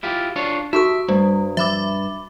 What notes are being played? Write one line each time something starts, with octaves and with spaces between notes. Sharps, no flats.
E4 F4 G4
D4 F4 C#5
D#4 F#4 G4 A4 E5 A5 C#6 D#6
G2 G3 A3
F3 E5 B5 D6 E6